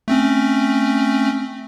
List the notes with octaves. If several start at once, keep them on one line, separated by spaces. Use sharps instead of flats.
A3 C4 C#4